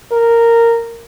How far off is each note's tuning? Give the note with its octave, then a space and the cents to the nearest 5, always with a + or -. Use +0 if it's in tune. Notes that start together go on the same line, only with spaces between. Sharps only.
A#4 -10